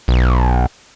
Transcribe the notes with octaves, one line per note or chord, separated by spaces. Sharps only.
B1